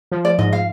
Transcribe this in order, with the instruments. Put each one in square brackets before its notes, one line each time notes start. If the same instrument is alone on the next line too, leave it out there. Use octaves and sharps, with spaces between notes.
[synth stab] F3
[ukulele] D5
[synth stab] G#2 [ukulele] D#5
[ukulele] F5